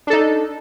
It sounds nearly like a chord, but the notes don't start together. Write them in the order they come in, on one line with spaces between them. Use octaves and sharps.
D4 A4 D#4